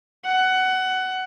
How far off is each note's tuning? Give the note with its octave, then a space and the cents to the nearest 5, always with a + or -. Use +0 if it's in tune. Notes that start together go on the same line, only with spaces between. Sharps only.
F#5 +15